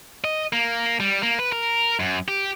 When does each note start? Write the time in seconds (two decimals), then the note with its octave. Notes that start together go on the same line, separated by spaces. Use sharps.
0.24 D#5
0.53 A#3
1.00 G3
1.23 A#3
1.39 B4
1.52 A#4
2.00 F#2
2.28 G4